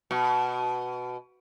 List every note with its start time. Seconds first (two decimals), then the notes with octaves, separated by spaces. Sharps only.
0.11 B2